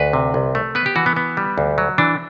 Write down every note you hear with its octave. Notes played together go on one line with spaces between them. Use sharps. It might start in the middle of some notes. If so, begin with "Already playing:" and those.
Already playing: D2 B4
C3
C2
A3
B3 B4
G4
E3 F#4
B3
B3
G3
D2
F#3
E3 D4